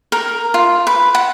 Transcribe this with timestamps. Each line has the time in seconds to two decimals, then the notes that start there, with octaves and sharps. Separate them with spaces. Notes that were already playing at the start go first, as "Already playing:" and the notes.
0.12 A#4
0.54 F4
0.87 B4
1.15 F#5